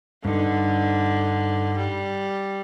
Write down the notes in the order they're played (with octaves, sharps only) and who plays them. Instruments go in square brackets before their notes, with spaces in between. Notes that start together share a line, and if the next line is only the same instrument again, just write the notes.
[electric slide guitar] G2 D#4 [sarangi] D3
[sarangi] G3